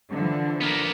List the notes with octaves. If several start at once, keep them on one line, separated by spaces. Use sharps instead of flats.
D3 E3 F3
A#3 B3